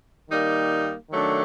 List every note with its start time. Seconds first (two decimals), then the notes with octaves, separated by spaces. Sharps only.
0.30 D#3 G3 A#3 D#4
1.10 D#3 F#3 A3 D4